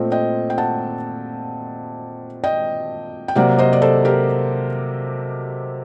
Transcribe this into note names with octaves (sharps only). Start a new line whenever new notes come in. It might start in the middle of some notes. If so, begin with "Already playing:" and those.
Already playing: A#2 A3 C4 D#5 G5
D#5 G5
G5
F#5 A5
D#5 G5
G5
C3 F#3 A#3 D5 F#5
C5 D#5
D5
A4 C5
G4 A#4